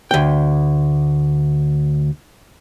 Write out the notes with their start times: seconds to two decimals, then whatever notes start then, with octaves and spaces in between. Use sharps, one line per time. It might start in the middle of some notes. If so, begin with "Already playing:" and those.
0.11 D2 G5